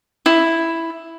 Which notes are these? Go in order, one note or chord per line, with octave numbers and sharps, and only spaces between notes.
E4